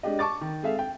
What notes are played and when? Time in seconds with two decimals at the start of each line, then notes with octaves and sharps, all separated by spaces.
0.03 G#3 D4 G4 D#5
0.19 A5 C#6 D6 A6
0.41 D#3
0.63 G#3 C4 G#4 A4 E5 F5
0.79 G5